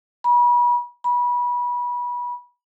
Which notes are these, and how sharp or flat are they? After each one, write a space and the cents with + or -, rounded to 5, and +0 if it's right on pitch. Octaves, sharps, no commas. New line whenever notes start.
B5 -35
B5 -25